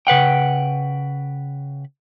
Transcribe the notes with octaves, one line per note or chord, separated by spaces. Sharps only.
C#3 B4 F#5 G5